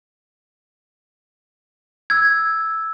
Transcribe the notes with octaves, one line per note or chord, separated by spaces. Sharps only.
E6 G#6